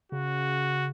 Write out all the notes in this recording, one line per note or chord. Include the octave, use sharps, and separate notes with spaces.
C#3 F#4